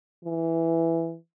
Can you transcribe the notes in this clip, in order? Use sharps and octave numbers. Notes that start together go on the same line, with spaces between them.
E3